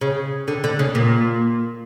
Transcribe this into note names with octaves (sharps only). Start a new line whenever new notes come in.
C#3
D3
D3
C#3
A#2